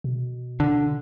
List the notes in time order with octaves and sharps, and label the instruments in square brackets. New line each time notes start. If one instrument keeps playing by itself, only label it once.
[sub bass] B2
[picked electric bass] D3